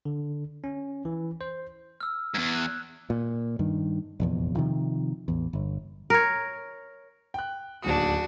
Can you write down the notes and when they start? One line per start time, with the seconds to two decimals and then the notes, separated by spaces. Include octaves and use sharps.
0.05 D3
0.64 C#4
1.05 E3
1.41 C5
2.01 E6 F6
2.35 E2 G#2 G#6
2.54 F#6
3.10 A#2
3.59 G2 D#3
4.20 F1 A#1 E2
4.55 C3 D#3 F3
5.28 A1 E2
5.53 G1
6.10 A#4 C#5
7.34 G5 F#6
7.82 D1 D#2 D4 F#4 D#6